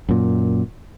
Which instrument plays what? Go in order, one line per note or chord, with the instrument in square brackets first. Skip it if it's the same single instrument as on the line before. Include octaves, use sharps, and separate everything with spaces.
[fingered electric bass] F#2 A#2